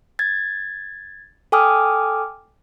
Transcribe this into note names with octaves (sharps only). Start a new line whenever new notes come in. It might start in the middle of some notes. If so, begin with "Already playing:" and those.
G#6 A6
A4 G5 G#5 D6 D#6 F6